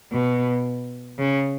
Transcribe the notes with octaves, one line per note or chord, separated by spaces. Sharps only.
B2
C#3